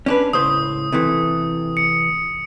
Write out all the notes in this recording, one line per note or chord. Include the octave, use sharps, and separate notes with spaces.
C#4 D4 B4
C#2 A2 C5 D#6
C3 E3 A3
C#7